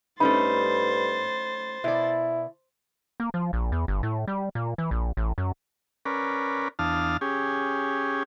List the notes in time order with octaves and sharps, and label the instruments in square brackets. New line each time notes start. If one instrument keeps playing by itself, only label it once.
[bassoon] G2 [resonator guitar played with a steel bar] A3 C#4 D#4 [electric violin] C5 A6 [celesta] B5
[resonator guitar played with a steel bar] B2 D5 [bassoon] E4
[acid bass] A#3
F3
A#1
E2
G1
A2
G3
A#2
E3
A#1
A1
F#2
[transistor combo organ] C#4 A#4 B4 D5
E2 D4 F5 A5 D#6 F6
C#4 G4 G#4